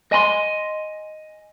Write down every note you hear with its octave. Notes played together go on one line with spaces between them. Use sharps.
D#5 G#5 B5 C6